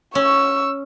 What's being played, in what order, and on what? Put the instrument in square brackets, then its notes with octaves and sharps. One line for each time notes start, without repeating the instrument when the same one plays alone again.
[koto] C#4 [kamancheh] C#6 E6